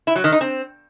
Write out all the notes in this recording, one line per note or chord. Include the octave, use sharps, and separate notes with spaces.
E4
F#3
D#3
D#4
C4